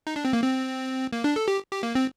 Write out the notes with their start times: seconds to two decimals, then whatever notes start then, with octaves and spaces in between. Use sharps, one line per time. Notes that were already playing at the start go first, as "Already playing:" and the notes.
0.07 D#4
0.16 D4
0.25 C4
0.33 A#3
0.42 C4
1.13 A#3
1.24 D4
1.36 A4
1.48 G4
1.71 G4
1.83 A#3
1.95 C4